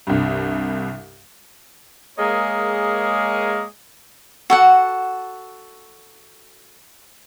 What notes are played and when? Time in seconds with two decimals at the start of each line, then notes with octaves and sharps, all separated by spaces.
0.07 C2 G2
2.18 G#3 A#3 G#4 A#4 C#5 D#5
4.50 F#4 A4 F#5